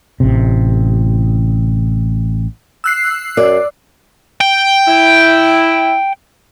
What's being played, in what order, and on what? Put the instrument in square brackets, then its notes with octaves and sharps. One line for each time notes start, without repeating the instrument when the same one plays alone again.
[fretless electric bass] A1 C3
[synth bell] E6 F#6 C7
[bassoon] F#2 [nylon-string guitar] D5
[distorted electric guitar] G5
[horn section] E4